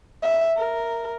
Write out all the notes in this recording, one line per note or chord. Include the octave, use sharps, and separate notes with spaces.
E5
A#4